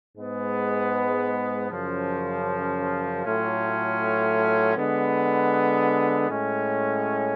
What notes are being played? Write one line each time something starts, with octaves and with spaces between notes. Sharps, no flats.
G#2 G#3 B3
F#2 C#3 F3
A2 F#3 A3 C#4 F4
D3 G#3 B3
A2 G#3 C#4